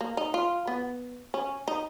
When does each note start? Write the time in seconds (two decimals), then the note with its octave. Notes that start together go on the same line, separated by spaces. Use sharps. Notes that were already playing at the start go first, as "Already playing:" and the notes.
0.01 A#3
0.17 D#4
0.34 F4
0.67 B3
1.34 C#4
1.68 D#4